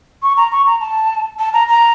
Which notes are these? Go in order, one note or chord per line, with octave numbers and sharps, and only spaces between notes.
C#6
A#5
C#6
A#5
A5
A5
A#5
A#5